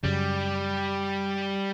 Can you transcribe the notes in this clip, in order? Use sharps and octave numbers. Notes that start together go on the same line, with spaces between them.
F#2 C#3 G3